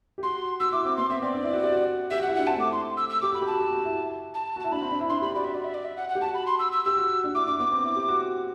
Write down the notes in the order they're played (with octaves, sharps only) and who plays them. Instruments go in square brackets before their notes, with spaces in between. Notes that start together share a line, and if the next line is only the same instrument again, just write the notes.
[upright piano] G4
[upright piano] F#4 [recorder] C6
[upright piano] F#4 [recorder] E6
[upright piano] E4 [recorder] D6
[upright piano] C4 [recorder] D6
[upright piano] B3 [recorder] C6
[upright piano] C4 [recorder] E5
[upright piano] C4 [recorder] D5
[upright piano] D4
E4
F#4
G4
F#4
[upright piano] G4 [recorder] E5
[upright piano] F#4 [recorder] F#5
[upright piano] E4
[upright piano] D4 [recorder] F#5
[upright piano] C4 [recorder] A5
[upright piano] A3 [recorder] D6
[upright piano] E4
[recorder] C6
E6
E6
[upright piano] G4 [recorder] D6
[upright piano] F#4 [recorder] B5
[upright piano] G4
[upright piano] F#4 [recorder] A5
[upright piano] G4
F#4
E4
[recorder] A5
[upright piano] F#4
[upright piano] E4 [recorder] A5
[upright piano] D4 [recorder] B5
[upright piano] C4
D4
E4
[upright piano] D4 [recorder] C6
[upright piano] G4 [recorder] B5
[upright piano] F#4 [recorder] D5
[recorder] E5
D5
E5
D5
E5
F#5
F#5
[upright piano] G4
[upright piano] F#4 [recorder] A5
[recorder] B5
C6
E6
E6
[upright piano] G4 [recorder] E6
[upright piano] F#4
D4
[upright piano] E4 [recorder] D6
[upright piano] D4 [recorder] D6
[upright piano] B3 [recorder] D6
[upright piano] C4
E4
G4
F#4